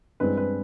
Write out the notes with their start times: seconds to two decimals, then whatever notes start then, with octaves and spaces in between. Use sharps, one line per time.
0.20 G2 E3 G#3 C4 B4
0.37 B4